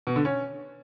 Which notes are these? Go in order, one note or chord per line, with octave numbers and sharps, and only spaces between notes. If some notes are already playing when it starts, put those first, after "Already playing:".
B2
D3
C#4